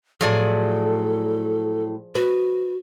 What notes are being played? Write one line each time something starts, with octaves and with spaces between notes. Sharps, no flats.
A2 F3 F#3 G#4 A4 D5
F#4 B4